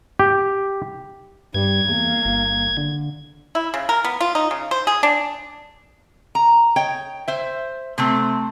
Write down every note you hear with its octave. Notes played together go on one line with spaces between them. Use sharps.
G4
G2 G3 G#6
E2 A#3
G1
D3
E4
C#3
A#4
B3
F4
D#4
C#3
C5
G#4
D4
A#5
C#5 D#5 G5
C5 E5
C3 A3 C4